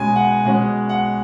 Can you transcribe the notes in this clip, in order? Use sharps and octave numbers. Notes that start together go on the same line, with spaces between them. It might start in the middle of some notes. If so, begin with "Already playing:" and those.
Already playing: B2 G#3 C#4 G#5
F#5
B2 G#3 C#4 F#5
F#5